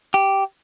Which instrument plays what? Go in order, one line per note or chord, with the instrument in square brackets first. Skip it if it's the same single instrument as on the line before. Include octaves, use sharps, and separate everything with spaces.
[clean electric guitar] G4